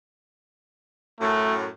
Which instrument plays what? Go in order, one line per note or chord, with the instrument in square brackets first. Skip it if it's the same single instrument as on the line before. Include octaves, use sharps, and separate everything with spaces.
[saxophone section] F#2 A2 [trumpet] A3